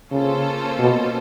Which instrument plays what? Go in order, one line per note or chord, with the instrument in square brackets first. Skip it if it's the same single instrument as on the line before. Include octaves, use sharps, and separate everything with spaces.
[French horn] C#3 [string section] A#3 C#4 F4 A4 C5
[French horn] B2